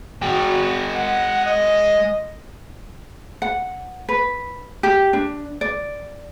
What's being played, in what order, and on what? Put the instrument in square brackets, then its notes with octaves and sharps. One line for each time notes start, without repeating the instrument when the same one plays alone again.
[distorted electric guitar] G#3 G5 [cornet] F#4
[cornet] F#5
D#5
[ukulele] F#5
B4
G4
D4
D5